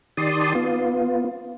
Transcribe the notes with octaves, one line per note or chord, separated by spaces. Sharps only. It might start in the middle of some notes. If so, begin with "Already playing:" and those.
D#3 G4 D5 A5 C6 D#6
B3 F4